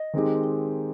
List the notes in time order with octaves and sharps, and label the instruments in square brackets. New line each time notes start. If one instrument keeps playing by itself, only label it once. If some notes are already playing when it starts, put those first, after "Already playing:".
Already playing: [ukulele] D#5
[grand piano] D#3 G#3 C4 D#4 G4